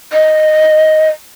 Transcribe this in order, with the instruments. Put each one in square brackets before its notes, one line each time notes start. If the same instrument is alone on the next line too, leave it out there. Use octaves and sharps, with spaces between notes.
[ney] D#5